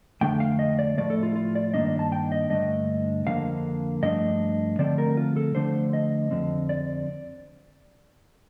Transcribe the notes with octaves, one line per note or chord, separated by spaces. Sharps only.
F2 D3 A3 D4 G5
F5
D#5
D5
A2 F3 A3 D5
A4
F4
F4
D5
G2 D#3 A#3 D4 D#5
D#5
A5
G5
D#5
G2 D3 A3 D4 D#5
F2 D3 F3 A#3 F5
G2 F3 A3 D4 D#5
D3 F3 A3 C4 D5
A#4
F4
A4
D3 F3 A3 D4 C5
D#5
F2 D3 F3 C4
D5